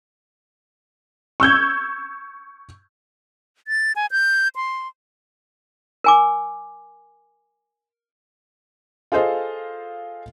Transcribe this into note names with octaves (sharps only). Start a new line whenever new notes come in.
C#6 E6 G6 G#6
A6
G#5
G6
C6
A#4 G#5 D6
F4 G#4 A4 C5 D#5 F5